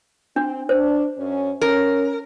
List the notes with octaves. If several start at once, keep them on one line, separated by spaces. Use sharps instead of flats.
C4 D4
D4 C5
F#2 C#4
C#4 A#4